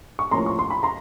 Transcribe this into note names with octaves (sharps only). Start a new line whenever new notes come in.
C#6
A2 F3 A#3 C#4 A#5 C6
C#6
C6
B5
A#5 C6